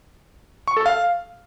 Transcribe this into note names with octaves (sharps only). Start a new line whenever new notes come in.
C#6
A4
F5